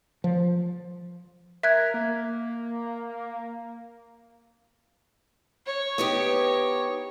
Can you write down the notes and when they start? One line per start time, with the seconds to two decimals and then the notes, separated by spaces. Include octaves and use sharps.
0.24 F3
1.63 A#4 E5 F#6 G#6
1.94 A#3
5.66 C#5
5.98 B3 D#4 G4